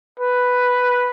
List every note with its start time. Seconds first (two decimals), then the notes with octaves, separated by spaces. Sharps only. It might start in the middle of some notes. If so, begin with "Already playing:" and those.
0.20 B4